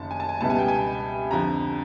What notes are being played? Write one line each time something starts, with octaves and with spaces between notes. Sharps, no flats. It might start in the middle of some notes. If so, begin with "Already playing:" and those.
Already playing: F#1 F#2 D#3 A5
G#5
A5
G#5
C#2 B2 G3 B3 E4 A5
G#5
G5
G#5
F2 D3 F3 A#5